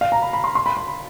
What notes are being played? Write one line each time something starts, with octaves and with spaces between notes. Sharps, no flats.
F5
A#5
B5
B5
C6
C6
B5
B5